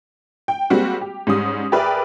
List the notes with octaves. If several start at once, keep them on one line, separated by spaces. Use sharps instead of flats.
G5
G3 G#3 A#3 C4 F#4
G4
G#2 G3 C#4 D#6
G4 G#4 A#4 B4 D5 E5